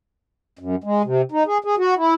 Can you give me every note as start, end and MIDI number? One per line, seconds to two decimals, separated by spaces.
0.59 0.76 42
0.84 1.02 56
1.04 1.22 48
1.32 1.43 63
1.46 1.58 68
1.64 1.75 68
1.78 1.95 66
1.97 2.14 64